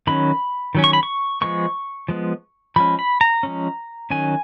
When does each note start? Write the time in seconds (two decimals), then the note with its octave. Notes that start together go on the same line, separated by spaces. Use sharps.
0.07 D#3 F#3 C#4 B5
0.75 D#3 F#3 C#4
0.84 C#6
0.93 B5
1.03 C#6
1.41 F3 G#3 B3 C#6
2.09 F3 G#3 B3
2.76 F3 G#3 C#4 B5
2.99 B5
3.21 A#5
3.43 F3 G#3 C#4
4.10 D#3 F#3 C#4 G#5